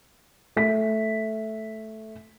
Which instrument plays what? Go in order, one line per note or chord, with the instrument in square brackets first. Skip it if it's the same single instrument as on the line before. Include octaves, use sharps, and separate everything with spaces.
[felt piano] A3 B6